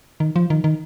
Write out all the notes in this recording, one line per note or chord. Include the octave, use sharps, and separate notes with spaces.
D#3
F3
D#3
D#3